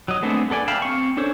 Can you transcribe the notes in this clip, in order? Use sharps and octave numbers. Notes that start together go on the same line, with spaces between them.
F#3 D#5
G#3 A3 B3 C4 D4
B3 A4 D5 G#5
E5 F5 G5 A5 B5
C4 C#6
C#4 D4 A4 C5 C#5